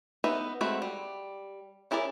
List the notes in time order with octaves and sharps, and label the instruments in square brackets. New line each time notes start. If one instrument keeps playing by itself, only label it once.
[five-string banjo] B3 D#4 B4 E5
G#3 A3 C4 F#4 B5
G3
C#4 E4 G#4 A#4 D5